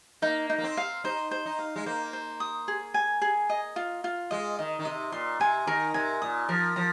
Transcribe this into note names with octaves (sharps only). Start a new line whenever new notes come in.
A#3 D#4
D#4
A#3
C4
F5
D#4 C5
C5
D#4
F5
G#3
A#3 C5
C5
D#6
G#4
G#5
G#4
D#5
F4
F4
G#3 D#5
D#3 D#5
D#3
C3 D#5
A#2 C6
C3 G#5
D#3 A#4
C3 G#5
A#2 D#6
F3 A#4
F3 A#5